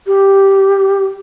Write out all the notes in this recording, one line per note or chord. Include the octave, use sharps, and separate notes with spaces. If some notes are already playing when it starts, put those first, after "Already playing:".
G4